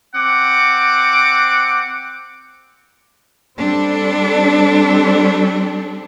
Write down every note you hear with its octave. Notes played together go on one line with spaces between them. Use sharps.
C4 F#5 D6
G3 C4 D4 A4